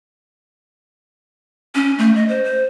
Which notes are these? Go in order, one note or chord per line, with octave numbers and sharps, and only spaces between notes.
C#4
A3
D#5
C5
C5